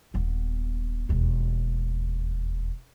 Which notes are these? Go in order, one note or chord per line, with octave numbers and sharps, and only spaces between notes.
D#1 B3
E1 D#2